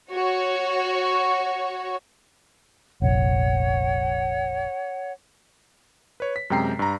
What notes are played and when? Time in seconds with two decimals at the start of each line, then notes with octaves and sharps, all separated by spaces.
0.13 F#4 C#5
3.02 F1 A#1 C#5 F#5
6.20 B4 C#5
6.36 B6
6.50 F#2 C3 G#3 G5 A#5 C7
6.79 G2 A#5